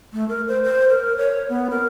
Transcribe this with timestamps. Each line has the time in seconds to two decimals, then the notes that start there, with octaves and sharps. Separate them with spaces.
0.13 A3
0.29 A#4
0.48 C5
0.63 C5
0.89 A#4
1.17 C#5
1.49 B3
1.70 A#4